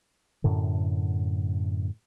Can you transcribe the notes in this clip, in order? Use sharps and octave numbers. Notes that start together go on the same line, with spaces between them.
F#2 A2 D3